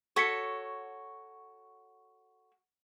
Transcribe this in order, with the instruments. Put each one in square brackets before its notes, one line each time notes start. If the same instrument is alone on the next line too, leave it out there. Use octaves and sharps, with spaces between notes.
[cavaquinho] F#4 A4 C#5 [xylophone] C#6 B6 C#7